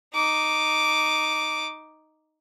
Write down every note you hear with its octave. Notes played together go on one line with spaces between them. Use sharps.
D#4 D6